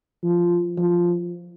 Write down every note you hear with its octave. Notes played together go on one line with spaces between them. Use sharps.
F3
F3